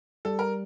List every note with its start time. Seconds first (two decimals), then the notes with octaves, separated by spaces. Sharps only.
0.25 G3 A4
0.39 A#4